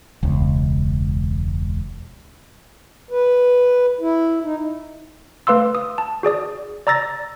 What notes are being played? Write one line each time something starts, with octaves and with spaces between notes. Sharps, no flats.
E1 C#2
B4
E4
D#4
A3 B4 F5 C6 E6
D#6
A5
F#4 G#4 D5 D#6
D5 A#5 E6 A6 A#6